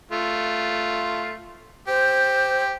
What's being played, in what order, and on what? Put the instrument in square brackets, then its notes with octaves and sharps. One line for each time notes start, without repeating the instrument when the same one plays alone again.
[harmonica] A3 F4
[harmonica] G4 [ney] C5